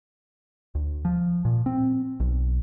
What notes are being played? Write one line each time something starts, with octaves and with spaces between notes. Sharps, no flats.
D2
F3
A#2
C4
B1